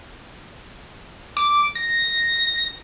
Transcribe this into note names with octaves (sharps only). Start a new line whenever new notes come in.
D6
A#6